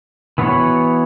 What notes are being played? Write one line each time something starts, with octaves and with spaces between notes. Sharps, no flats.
E3 B3 F#4 C#5